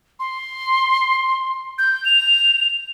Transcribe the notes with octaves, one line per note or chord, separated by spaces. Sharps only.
C6
G6
F7